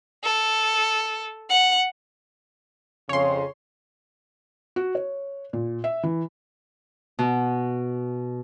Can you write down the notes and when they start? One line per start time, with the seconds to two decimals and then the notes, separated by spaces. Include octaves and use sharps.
0.24 A4
1.50 F#5
3.09 F2 C#3 C#5 C6
4.76 F#4
4.95 C#5
5.53 A#2
5.84 E5
6.03 E3
7.19 B2